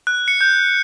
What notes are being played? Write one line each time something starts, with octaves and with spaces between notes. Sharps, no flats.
F#6
C#7
G6